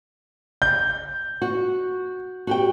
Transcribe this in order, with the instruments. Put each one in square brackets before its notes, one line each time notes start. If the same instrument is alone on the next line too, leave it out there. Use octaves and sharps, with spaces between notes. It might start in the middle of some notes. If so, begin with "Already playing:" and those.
[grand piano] G6
[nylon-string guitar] F#4
F#4 G4 G5